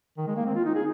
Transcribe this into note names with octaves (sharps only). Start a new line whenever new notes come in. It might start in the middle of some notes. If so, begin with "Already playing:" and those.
D#3
G#3
A#3
C4
F4
D#4
G#4